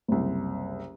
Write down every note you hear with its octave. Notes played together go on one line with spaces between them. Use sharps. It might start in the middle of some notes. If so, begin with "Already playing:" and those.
F#1 C2